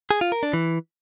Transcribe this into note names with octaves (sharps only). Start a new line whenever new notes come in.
G#4
F4
A#4
D4
E3